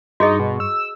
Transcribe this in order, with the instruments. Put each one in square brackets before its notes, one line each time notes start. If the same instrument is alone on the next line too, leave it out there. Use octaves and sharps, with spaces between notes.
[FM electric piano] G2 C#6 [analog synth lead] D#4 [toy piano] F#4 G#4 D#5
[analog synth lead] B2
E6